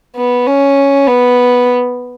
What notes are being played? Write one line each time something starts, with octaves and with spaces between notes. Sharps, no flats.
B3
C#4
B3